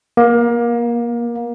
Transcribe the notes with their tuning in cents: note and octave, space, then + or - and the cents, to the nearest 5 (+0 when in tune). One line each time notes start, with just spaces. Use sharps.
A#3 +25